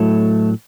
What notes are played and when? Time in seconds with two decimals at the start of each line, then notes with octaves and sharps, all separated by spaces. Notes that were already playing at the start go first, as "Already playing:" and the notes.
Already playing: A2 F#3 A3